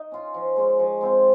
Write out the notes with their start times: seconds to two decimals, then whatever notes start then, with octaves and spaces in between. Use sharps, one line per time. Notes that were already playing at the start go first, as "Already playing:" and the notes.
Already playing: D#4
0.12 C#4 F4
0.34 F3
0.56 G#3 C#4
0.79 F3
1.01 G#3 C4 F4